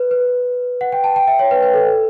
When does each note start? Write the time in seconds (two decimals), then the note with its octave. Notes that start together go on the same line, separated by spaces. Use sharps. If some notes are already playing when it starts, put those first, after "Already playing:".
Already playing: B4
0.11 B4
0.81 F#5
0.92 G5
1.04 A5
1.16 G5
1.28 E5
1.39 C#5
1.51 B4
1.63 B4
1.74 A4